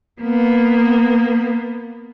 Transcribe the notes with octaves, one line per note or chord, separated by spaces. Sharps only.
A#3 B3